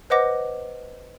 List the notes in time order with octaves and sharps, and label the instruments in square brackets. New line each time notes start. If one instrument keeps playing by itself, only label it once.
[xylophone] B4 C5 D#5 F#5 D6 A#6